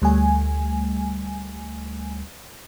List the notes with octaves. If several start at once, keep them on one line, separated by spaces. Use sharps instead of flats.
D2 G3 A3 G#5